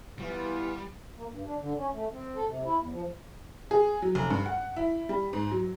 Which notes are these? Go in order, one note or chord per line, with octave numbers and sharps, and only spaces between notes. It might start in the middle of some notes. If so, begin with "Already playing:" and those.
E3 G3 B3 F4
A#3
G2
D4
D3
C#4
A3
C4
A4
C3
E4
E2
F3
G#4
F#3
F1
G2
F#5
E4
G3
G#2
F#3